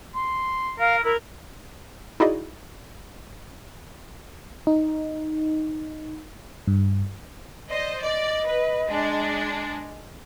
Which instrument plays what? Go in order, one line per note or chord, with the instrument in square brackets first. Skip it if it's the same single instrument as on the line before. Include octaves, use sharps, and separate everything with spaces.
[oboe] C6
[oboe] A#4 [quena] F5
[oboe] E4 [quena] A#4
[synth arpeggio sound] D#4 E4 F#4 G#4 D5 D#5
[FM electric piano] D#4
G2
[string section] C5 D#5 [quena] D5
[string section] D5 [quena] D#5
[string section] B4
G#3 D4